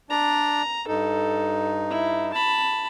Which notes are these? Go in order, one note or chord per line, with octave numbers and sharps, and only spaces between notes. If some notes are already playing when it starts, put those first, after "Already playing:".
D4 D5 A#5
G2 D#4 A4
E4
A5 B5